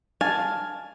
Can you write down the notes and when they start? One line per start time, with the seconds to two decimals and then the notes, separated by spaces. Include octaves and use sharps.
0.21 F5 G#5 A5